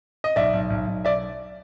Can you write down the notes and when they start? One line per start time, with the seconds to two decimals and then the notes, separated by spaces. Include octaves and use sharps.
0.24 D#5
0.36 B1 D5 E5
0.53 B1
0.70 B1
0.87 B1
1.05 D5 E5